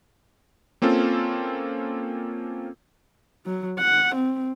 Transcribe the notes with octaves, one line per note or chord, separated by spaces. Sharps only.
A#3 C4 C#4 F4 A4
F#3
F#5
C4